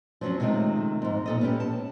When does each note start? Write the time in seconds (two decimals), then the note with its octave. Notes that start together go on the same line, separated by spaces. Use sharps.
0.21 F3 F#3 A3 C4 C#4
0.40 C3 D#3 G#3 A3 F4
1.02 F2 G#2
1.26 A#2 A4 D#5
1.41 B3 C#4 G4
1.60 A5